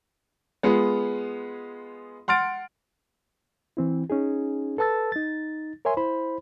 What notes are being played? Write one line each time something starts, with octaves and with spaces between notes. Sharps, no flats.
G#3 B3 F4 G#4
F#5 C6 F6 A6 D7
E3 C4 E4
C#4 D#4 G#4
A4 B4 A5 E6 A6
D#4 A6
A#4 C#5 E5 G#5 C6
E4 C5 B5